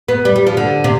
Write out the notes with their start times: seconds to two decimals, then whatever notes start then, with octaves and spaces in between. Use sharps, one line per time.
0.08 B3
0.25 G3
0.36 G3
0.47 F3
0.57 D3
0.84 C3